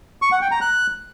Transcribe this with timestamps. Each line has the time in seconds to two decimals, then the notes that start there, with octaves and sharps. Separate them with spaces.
0.22 C#6
0.32 F#5
0.42 G5
0.51 A#5
0.61 F#6